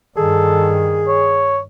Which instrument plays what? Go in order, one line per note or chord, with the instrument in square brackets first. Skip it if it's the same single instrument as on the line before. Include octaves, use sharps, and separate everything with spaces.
[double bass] G2 D#3 [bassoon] G#4 [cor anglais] A4
[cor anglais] C#5